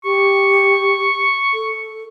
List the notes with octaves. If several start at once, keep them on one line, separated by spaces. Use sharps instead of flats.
G4 C#6
A4